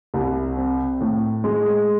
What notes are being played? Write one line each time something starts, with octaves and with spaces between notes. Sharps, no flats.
C2
C4
A2
G#3